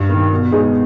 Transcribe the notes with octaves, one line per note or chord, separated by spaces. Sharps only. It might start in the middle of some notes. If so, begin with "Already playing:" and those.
Already playing: G2
D#3 A#3
B2
G#3 B3 D#4 G#4